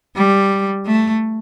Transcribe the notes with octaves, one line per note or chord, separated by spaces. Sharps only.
G3
A3